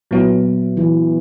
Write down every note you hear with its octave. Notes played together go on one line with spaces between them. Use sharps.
A#2 F#3 B3 E4
E3